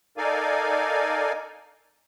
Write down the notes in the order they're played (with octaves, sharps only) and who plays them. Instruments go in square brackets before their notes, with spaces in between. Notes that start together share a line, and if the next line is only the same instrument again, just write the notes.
[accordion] D#4 A4 A#4 D5 F5 G#5